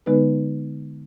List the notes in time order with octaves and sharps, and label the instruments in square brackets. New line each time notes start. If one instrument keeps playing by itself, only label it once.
[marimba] D3 G#3 B3 D#4 B4